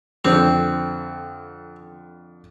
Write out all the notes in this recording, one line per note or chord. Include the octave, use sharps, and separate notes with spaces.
F2 D3 C4